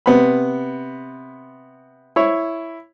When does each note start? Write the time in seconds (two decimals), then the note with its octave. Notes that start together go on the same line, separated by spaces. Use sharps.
0.06 C3 B3 B5
2.16 E4 C#5